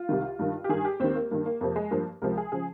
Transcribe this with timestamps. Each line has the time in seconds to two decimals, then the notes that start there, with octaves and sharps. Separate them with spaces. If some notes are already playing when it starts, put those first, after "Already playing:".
Already playing: F4
0.09 C2 C3 D#3
0.39 G2 D#3
0.64 G4
0.69 G2 D#3 G#4
0.85 G4
1.00 D#2 D#3 C4
1.15 A#3
1.31 G2 D#3 A#3
1.46 A#3
1.61 F2 C3 F3 A#3
1.76 G#3
1.91 G2 F3 A#3
2.22 C#2 C3 F3 A#4
2.38 G#4
2.52 C#3 F3 G#4